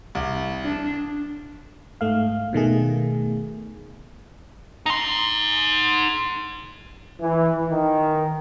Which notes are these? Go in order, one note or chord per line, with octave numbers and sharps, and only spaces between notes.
C2
D4
G#2 A3 F5
B2 D#3 A3 G#4
D#4 C6
E3
D#3